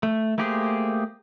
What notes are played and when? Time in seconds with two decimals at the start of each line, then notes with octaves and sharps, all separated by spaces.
0.03 A3
0.38 A3 A#3 G4 G#4 C5